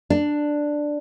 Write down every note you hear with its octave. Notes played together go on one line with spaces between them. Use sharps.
D4